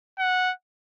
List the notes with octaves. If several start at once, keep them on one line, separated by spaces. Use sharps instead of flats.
F#5